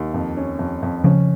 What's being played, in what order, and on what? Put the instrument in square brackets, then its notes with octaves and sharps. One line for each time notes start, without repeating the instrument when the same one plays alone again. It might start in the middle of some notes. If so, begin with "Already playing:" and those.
Already playing: [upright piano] D#2
F2
C#4
F2
F2
[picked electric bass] C#3 F3 [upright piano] C#4